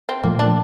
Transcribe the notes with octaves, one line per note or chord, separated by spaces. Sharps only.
C4
A#2 F3 A3 A#3
D4